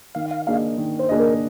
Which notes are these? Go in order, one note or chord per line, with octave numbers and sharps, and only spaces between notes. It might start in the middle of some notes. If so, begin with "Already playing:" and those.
D#3 F5
F5
A#3 D4 G#4 D#5 F5
D#3
C5
A#3 D4 G#4 D#5
A#4